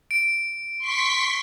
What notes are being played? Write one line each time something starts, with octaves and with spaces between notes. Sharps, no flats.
D7
C6 C#6 B6